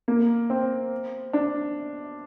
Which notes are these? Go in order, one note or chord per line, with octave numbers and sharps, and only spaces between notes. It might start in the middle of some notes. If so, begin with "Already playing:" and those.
A#3
C4
D4